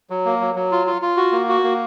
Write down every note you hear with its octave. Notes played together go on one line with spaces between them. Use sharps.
F#3
A#3
F#3
F#3
F4
F4
F4
F#4
A#3
F#4
A#3